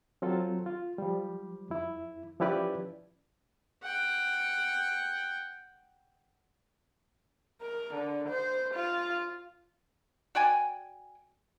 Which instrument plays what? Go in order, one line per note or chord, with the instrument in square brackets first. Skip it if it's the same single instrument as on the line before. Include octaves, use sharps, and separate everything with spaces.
[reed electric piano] F#3 C4 F4 A4
F4
F3 G3
F2 E4
F3 C#4 E4 G4 B4 D5
[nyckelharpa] F#5 G5
[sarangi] A#4
D3
C5
F4
[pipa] F#4 D5 G5 G#5